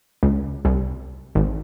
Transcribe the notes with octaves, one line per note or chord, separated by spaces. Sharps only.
C#2
C2
G#1